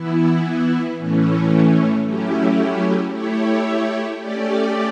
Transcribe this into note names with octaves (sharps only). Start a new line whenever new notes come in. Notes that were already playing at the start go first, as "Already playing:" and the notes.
Already playing: E3 B3 E4
A2 E3 A3 C#4
F#3 A3 C#4 E4 G4
A3 E4 G4 C#5
A3 C#4 G4 D5